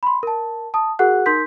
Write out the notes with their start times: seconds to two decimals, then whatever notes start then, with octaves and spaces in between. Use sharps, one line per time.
0.03 B5 C6
0.23 A#4 A5
0.74 A5 D#6
0.99 F#4 G#4 A#4 F#5 F#6
1.26 D#4 A#4 C6 G6 B6